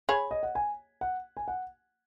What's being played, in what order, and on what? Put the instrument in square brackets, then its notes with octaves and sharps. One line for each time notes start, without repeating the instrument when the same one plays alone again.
[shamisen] G#4 C#5 [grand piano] B5
[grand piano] D#5
F#5
G#5
F#5
G#5
F#5